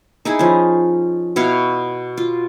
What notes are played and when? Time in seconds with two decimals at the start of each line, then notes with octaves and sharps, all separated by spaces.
0.25 D#4 E4 G#4
0.39 F3 C#4
1.36 B2 E4 C#5 F5
2.17 F4